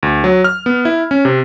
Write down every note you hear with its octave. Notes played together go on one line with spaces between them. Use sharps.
D2
F#3
F6
B3
E4
C#4
C3